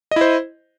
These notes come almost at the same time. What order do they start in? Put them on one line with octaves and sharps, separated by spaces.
D#5 E4 C5